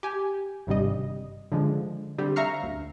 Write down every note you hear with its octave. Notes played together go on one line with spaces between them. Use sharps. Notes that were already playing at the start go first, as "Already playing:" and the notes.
G4 G#5
G#1 G2 C3 G3 D#5
D3 F3 G#3
D3 G3 C4
E5 F5 A#5 C#6 F6 C7
D2